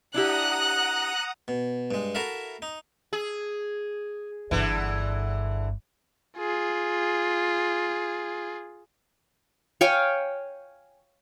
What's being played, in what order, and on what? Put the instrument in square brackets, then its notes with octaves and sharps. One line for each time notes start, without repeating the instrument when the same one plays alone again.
[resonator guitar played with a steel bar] D4 E4 G4 [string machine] F#5 A#5 D#6 [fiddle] F#6
[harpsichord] B2
G2 G#3
E4 F#4 A4 A#4 E5 F5
D#4
[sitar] G#4
[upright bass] G1 G2 [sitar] D3 E3
[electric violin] F4 G#4
[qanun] C#5 F5 G5 G#5